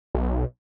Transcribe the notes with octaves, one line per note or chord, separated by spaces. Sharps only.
B1